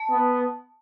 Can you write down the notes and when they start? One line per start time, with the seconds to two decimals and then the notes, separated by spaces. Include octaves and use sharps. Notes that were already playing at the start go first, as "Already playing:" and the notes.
Already playing: A5
0.11 B3